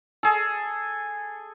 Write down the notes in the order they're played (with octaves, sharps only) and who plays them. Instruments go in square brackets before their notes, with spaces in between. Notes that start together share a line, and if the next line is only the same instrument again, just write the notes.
[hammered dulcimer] G#4 A4